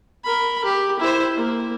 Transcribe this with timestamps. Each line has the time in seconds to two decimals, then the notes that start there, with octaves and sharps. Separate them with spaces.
0.24 A#4 B5
0.65 G4
0.99 E4 C5
1.36 A#3